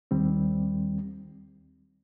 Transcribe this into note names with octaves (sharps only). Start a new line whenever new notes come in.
D#2 D#3 G3 C4